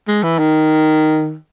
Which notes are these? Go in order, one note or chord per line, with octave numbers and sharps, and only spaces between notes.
G#3
E3
D#3